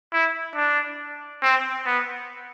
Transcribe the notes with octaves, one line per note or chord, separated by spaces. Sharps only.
E4
D4
C4
B3